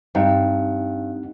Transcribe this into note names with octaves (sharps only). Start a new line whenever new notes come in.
G2 C4 D#4 F#5